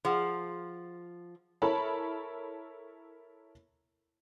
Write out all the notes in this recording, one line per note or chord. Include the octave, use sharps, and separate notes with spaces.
F3 G#4 F#5
E4 A4 A#4 C#5 A5 B5